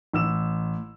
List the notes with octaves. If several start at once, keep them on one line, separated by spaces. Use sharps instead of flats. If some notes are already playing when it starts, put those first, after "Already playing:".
A1 E6 E7